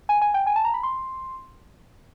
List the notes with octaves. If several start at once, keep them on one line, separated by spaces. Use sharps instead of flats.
G#5
G#5
G5
G#5
A5
A#5
B5
C6